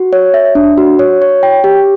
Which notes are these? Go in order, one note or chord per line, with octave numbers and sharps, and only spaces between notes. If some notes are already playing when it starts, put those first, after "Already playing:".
Already playing: F#4
C#5
E5
D4
F#4
C#5
C#5
G5
G4